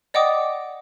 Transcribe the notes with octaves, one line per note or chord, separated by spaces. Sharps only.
D5 D#5 F#5 G5 D6 D#6